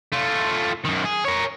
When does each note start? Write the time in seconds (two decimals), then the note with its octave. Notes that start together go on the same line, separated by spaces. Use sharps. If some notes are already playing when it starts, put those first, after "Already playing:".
0.13 A3 F4
0.85 F#2 D#3
1.05 G#4
1.25 A#4 C#5